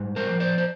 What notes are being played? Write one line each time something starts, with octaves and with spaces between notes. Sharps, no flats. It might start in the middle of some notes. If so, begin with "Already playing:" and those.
Already playing: G#2 G3
A#4 C5
F3
C5 D5
C5